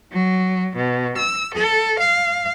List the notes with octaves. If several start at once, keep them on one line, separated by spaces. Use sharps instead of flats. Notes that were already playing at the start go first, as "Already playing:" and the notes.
F#3
B2
E6
A4
F5